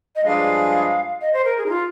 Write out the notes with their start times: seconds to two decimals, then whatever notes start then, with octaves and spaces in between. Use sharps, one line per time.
0.16 D#5
0.25 G2 F3 G#3 D4 G#4 F5
1.21 D#5
1.33 C5
1.45 A#4
1.58 G#4
1.66 D#4
1.69 F4